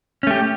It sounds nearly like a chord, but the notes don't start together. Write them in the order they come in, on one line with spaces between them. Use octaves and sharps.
C#4 A3 G4